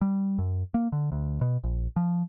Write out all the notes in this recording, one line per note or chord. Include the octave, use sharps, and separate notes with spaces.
G3
F#2
A#3
D3
D2
B2
A#1
F3